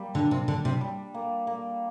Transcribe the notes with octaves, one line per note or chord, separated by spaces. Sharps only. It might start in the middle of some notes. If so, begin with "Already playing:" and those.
Already playing: G3 A#3 G4
D3 D4
C3
D3 D4
C3
G3
A#3
A#3